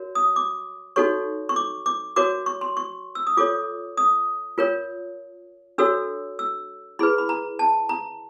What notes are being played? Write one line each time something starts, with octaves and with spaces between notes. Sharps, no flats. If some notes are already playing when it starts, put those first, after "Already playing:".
Already playing: F#4 A#4 C#5
D#6
D6
D#4 F#4 A4 C#5 C#6
C#6
D6
D6
F#4 A#4 C#5 D6
C#6
C6
C#6
E6
D#6
F4 A4 C#5 D6
D#6
F4 A#4 C#5
D4 F#4 A4 C#5 E6
E6
E4 G#4 B4 B5
B5
A#5
A5
A#5